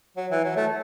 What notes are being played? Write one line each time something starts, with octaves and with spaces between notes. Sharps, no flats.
F#3
E3
F#3
A3